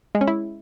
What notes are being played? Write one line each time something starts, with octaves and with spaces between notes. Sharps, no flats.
G#3
C#4
E4